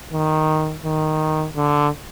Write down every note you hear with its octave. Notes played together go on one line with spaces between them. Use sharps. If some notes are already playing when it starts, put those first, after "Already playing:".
D#3
D#3
D3